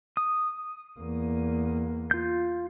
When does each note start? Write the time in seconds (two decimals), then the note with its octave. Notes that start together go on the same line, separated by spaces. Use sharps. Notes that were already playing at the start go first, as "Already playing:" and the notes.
0.17 D#6
1.00 E2 A#3
2.11 F4 G6